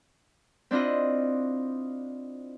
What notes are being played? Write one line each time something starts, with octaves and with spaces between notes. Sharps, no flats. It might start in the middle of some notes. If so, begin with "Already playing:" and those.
C4 D4 E4 F4 D#5